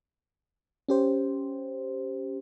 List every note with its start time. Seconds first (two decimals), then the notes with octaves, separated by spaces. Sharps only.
0.89 C#4 G4 C5